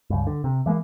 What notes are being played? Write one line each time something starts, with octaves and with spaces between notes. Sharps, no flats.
C#2 G2
D3
C3
E3 G#3 A#3